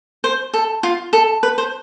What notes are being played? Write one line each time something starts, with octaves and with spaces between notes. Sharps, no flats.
C5
A4
F4
A4
B4
C5